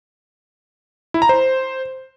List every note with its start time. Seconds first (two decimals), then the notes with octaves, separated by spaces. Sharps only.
1.14 E4
1.22 A#5
1.29 C5